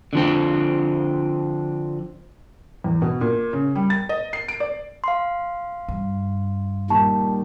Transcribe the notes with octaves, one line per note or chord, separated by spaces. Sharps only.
D3 F3 C4
E2
B2
A#2
C#3
G3
A6
D#5
C7
D7
D5
F5 C6
G2
A#2 D#3 G3 A5 C#6